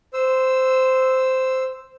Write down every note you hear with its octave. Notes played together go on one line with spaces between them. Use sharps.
C5 E6